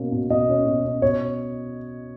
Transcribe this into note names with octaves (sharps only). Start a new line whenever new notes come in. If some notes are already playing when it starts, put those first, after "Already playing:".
Already playing: B2 A#3 C#4
B2
B2 D#5
C#4
B2
C#4
B2 C#5